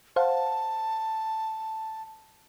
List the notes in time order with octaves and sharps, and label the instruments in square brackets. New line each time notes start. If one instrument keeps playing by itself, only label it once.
[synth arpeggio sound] C5 F5 F#5 [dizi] A5